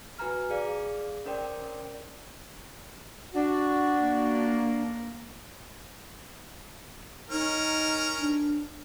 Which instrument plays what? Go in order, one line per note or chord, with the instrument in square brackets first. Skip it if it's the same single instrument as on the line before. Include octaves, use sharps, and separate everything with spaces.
[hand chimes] F#4 B4 G#5 A#5 F6
G#4 D5 F5
C#4 A#4 C5 D5 G5
[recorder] D4 [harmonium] F#4
[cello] A#3
[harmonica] C#4 A#4 [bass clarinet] D#4
[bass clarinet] D4